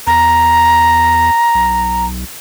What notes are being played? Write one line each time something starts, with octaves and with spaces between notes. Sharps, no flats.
E2 A#5
B1